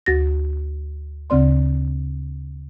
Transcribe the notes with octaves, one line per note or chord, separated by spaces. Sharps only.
D2 F#4 A6 A#6
D2 C#3 C4 D5 C6